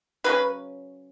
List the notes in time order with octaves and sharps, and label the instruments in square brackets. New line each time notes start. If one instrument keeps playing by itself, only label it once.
[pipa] C#3 F#3 C#4 B4